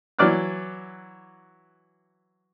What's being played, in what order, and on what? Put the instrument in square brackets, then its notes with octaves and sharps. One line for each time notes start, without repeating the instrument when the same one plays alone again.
[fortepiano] E3 F#3 D5 D6 F6 F#6